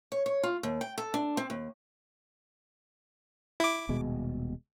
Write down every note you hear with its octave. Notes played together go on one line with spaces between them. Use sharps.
C#5
C#5
F4
D#2
G5
A4
D4
C4
D#2
E4 D6
D#1 B2 G#3